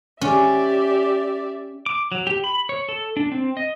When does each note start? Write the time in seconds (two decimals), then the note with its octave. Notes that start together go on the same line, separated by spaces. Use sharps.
0.21 C#4 G4 D5 E5
1.86 D6
2.12 F#3
2.27 G4
2.44 B5
2.69 C#5
2.89 A4
3.17 D4
3.32 C4
3.57 D#5